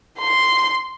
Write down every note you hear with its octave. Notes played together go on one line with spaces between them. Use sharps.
C6